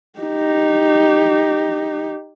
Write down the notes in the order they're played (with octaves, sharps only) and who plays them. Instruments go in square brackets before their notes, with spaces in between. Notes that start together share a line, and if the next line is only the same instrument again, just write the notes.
[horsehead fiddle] D#4 G4